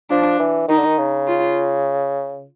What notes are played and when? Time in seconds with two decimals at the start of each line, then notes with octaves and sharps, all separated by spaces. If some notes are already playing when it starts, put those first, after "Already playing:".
0.10 F3 D4
0.40 E3
0.68 D#3 D#4
0.78 D3
0.86 D#3
0.98 C#3
1.28 F4